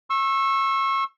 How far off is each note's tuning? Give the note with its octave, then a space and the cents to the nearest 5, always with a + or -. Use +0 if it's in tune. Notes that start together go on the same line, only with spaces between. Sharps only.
C#6 -30 E6 +0